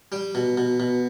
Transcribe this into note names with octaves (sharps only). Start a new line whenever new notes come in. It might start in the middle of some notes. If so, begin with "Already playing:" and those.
G3 G5
B2
B2
B2